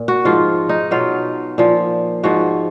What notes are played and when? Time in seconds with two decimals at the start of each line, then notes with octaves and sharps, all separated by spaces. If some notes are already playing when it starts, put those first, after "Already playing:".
Already playing: A#2
0.08 F#4
0.25 G#2 F3 F4
0.69 D#4
0.91 B2 F#3 F4
1.58 A#2 F3
2.23 G#2 F3 F#4